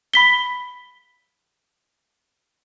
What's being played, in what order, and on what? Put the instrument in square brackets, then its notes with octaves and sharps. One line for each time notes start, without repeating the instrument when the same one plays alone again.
[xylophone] B5 B6 G7